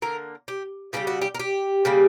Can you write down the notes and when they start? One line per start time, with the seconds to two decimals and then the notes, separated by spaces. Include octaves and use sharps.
0.02 D3 A#3 A#4
0.48 G4
0.93 C#3 E3 G3 G4
1.07 F#4
1.21 G4
1.35 A#4
1.40 G4
1.85 C#3 G3 A#3